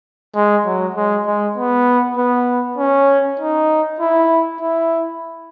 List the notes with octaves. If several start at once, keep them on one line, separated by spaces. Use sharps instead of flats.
G#3
F#3
G#3
G#3
B3
B3
C#4
D#4
E4
E4